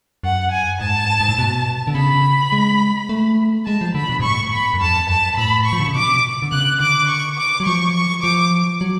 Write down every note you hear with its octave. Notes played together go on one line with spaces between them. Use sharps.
F#2 F#5
G#5
G#2 A5
G#2
A2
B2
D3
C#3 B5
G#3
A3
G#3 A5
F3
D3 B5
B2
G#2
A2 C#6
B5
F#2
F2 A5
F#2 A5
A2 B5
C#6
F3
D3
C#3
B2 D6
D3
C#3 F#6
D3 D6
C#6
D6
F#3
F3 C#6
C#6
F3 D6
F#3